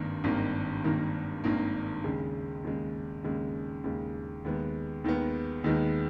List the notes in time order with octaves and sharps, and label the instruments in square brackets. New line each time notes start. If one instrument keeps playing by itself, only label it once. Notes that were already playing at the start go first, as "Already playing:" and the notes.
Already playing: [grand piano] G#1 G2 D#3 A#3
G#1 G2 D#3 A#3
G#1 G2 D#3 A#3
G#1 G2 D#3 A#3
D#2 C#3 G#3
D#2 C#3 G#3
D#2 C#3 G#3
D#2 C#3 G#3
D#2 D#3 G#3 B3
D#2 D#3 G#3 B3
D#2 D#3 G#3 B3